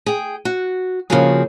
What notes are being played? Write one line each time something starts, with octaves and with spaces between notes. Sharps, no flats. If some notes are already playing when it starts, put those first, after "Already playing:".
G#4 G5
F#4
C#3 F3 A#3 C4 F#4 G#4